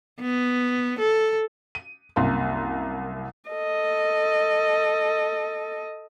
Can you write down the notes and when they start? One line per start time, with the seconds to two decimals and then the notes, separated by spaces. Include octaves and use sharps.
0.21 B3
0.99 A4
1.75 D#7
2.16 C2 F#2 A#3 C6
3.50 A4 D#5